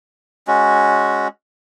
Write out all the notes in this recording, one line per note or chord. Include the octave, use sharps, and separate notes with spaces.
G#3 C#4 F#4